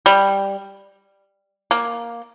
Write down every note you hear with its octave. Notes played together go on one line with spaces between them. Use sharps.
G3
A#3